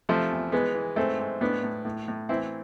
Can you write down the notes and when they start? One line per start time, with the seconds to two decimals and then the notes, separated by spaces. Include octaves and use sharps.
0.09 C3 F3 A3
0.31 E2
0.52 E3 G#3 B3
0.75 E3
0.96 G#2 A3 C4
1.19 G#2
1.41 A2 B3 D4
1.63 A2
1.85 A2
2.08 A2
2.29 E3 C4 E4